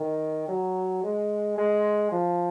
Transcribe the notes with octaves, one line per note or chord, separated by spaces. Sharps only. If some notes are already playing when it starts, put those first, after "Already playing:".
Already playing: D#3
F#3
G#3
G#3
F3